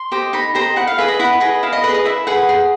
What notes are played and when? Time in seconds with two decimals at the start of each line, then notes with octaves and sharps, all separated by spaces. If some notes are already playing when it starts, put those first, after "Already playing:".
Already playing: C6
0.12 G4 C5 D#5
0.33 D#4 B5
0.55 G4 C5 D#5 A#5
0.76 E4 F#5
0.87 F5
0.98 G#4 B4 D#5 E5
1.08 D#5
1.19 E4 F#5
1.40 G#4 B4 D#5
1.63 E4 F5
1.73 D#5
1.84 B4 D#5
1.89 G#4
1.94 D#5
2.05 E4 E5
2.27 G#4 B4 F#5
2.49 G#4